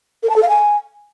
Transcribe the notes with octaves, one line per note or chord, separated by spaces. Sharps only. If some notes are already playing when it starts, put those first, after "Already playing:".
A#4
A5
A4
F5
G#5